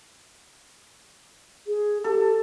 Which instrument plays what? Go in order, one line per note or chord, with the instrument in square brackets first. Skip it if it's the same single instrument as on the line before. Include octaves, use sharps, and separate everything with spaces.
[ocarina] G#4
[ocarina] G4 [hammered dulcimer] A4